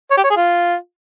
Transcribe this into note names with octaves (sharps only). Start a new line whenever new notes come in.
C#5
G4
C#5
G#4
F4